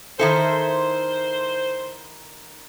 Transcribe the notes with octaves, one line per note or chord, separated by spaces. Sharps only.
D#3 E4 A4 C5